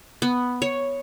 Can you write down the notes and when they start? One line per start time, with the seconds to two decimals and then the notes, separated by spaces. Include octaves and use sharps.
0.22 B3
0.62 C#5